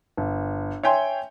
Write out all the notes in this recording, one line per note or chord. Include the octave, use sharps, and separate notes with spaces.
G1
C#5 E5 G5 G#5 C6